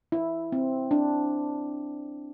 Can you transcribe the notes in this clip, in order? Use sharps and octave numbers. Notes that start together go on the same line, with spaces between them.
E4
C4
D4